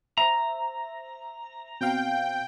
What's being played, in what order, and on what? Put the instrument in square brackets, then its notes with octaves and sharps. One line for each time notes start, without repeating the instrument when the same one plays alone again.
[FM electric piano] C5 E5 [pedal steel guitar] A#5
[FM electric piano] B2 C4 F5 [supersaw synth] G5